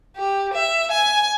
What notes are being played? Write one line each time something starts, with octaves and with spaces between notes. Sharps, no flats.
G4
E5
G#5